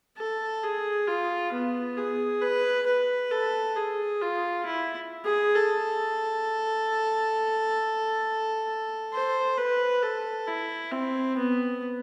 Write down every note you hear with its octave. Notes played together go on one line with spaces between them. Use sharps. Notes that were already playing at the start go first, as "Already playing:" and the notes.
A4
G#4
F4
B3
G#4
B4
B4
A4
G#4
F4
E4
G#4
A4
C5
B4
A4
E4
C4
B3